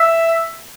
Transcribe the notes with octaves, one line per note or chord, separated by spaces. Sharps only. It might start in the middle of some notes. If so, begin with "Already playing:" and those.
Already playing: E5